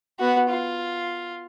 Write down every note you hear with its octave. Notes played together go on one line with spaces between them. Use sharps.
B3 F#4
F4